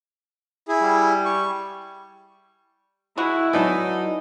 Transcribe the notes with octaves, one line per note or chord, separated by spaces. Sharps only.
E4 G#4
G3
C#6
G#3 E4 F#4
F#3 B3 D4 D#4 F#4 A4 G#5